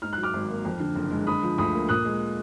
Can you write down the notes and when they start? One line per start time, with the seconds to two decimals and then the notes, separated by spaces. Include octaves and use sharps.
0.02 G#2 F6
0.13 F#3 F#6
0.23 D6 F6
0.33 G#1
0.49 A#3
0.65 F2
0.80 D3
0.95 F#1
1.11 G#3
1.27 D3 B5 D#6
1.43 F3
1.58 D2 B5 D#6
1.73 A#3
1.89 A#2 D#6 F#6
2.05 G#3